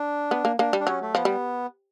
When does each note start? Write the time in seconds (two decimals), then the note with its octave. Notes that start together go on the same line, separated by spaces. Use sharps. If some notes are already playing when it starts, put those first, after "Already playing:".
Already playing: D4
0.31 B3
0.45 A#3
0.59 A#3 D4
0.73 G3
0.80 D4
0.86 F#3 C#4
1.02 A3
1.15 F3 B3
1.25 G3